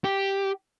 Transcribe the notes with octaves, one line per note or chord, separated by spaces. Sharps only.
G4